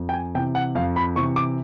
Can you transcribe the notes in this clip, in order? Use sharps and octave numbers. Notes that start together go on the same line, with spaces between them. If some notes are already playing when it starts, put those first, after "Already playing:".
Already playing: F2
G5
G#5
C3 E3 G5
F#5
F2 F5
B5
C3 E3 C#6
D6